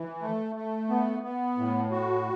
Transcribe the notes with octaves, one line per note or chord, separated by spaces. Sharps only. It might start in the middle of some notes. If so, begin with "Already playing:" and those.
Already playing: E3
A3
A3
B3
B3
A2
F#4